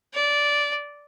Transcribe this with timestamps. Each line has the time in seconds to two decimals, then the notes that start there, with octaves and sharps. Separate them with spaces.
0.14 D5